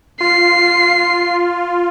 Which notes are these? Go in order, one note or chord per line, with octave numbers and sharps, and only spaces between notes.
F4 C7